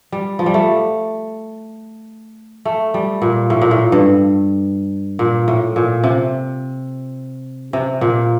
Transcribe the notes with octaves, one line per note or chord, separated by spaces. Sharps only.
G3
F3
G3
A3
A3
G3
A#2
A2
A#2
A2
G2
A#2
A2
A#2
C3
C3
A#2